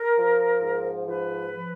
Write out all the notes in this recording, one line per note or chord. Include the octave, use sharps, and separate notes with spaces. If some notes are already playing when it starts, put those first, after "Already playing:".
Already playing: A#4
F3
G#2
F3 B4
F3